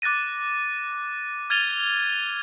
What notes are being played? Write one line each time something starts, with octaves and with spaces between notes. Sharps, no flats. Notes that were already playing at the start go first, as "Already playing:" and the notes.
D6 F#6 A6 A#6 D#7
F6 G#6 A6 D#7 F7 G7